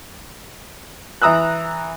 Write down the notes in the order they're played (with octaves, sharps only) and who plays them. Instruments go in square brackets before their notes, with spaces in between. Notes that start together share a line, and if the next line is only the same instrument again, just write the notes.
[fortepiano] E3 A#5 D#6 E6 F#6